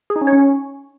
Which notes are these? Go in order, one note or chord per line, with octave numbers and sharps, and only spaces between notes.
G#4
D#4
C#4
C#5
C#4